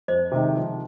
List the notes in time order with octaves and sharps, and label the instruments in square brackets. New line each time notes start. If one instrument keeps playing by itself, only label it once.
[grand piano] F2 [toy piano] C5 D#5
[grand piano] C3 D#3 G#3 D#4
F3